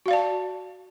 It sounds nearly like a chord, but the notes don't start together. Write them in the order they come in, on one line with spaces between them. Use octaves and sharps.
F#4 F5 D5 A5